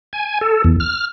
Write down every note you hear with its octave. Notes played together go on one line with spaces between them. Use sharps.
G#5
A4
E2
F6